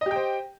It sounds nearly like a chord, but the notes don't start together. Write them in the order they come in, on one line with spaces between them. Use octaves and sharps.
D#5 G4 G5 C5